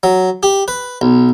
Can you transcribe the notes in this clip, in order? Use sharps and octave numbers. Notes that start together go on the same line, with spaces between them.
F#3
G4
B4
B1